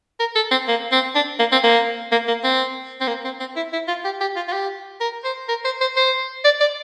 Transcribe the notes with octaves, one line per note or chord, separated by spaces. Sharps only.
A#4
A4
C4
A#3
C4
D4
A#3
C4
A#3
A#3
A#3
C4
C4
A#3
C4
C4
E4
E4
F4
G4
G4
F4
F4
G4
A#4
C5
A#4
C5
C5
C5
D5
D5